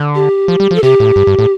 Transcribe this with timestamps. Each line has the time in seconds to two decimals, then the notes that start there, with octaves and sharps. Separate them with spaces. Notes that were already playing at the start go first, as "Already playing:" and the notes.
Already playing: D3
0.15 G4
0.48 F3
0.60 G3
0.71 F3
0.75 A4
0.83 C3 G4
1.00 A2
1.16 G2
1.27 G2
1.39 A2